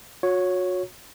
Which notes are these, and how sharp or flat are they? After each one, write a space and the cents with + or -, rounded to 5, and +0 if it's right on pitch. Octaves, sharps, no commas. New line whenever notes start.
F#4 -35 C#5 +0